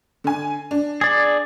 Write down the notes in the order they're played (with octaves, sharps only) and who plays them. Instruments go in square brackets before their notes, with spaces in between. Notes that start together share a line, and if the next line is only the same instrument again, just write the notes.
[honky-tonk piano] D3 G#5
D4
[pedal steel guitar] G#4 D5